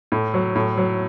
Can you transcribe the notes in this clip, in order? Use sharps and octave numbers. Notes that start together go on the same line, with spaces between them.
A2
F#3
A2
F#3